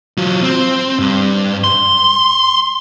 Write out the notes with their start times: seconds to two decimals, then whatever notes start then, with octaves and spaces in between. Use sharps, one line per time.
0.18 F#3 F4
0.43 C4
0.99 G2
1.64 C6